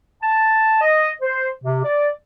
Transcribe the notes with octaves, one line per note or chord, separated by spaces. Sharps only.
A5
D#5
C5
C3
D5